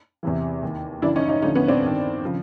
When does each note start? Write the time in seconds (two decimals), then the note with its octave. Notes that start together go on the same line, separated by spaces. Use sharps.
0.23 E2 C3 E3
0.63 D#2 D#3
1.02 F#2 C#3 E3 D4 E4
1.16 C#4 D#4
1.29 C#4 D#4
1.42 D2 D3 F3 C#4 D#4
1.55 B3 C#4
1.68 C4 D4
1.82 G2 D#3
2.24 C#3 F3